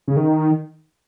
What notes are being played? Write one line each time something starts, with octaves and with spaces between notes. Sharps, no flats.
C#3
D#3